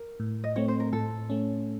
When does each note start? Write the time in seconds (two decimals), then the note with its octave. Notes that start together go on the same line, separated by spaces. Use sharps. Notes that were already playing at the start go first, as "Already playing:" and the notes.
Already playing: A#4
0.20 A2
0.44 D#5
0.56 A3 C4 C#5
0.68 C5
0.80 A#4
0.93 A2 A4
1.30 A3 C#4